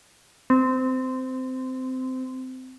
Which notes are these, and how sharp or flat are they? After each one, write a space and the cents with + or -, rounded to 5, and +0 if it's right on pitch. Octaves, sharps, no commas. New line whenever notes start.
C4 -20